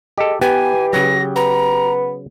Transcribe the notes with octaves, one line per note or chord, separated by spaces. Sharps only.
G#3 G4 A4
E3 B3 G4 G#5
C#3 F#3 A#6
B3 A#5